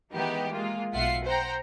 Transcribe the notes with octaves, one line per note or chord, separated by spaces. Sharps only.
D#3 E3 G#3 B3 D#4 G4
G#3 A#3 F4
B1 F4 E5 F#5 C7
C5 F#5 G5 A#5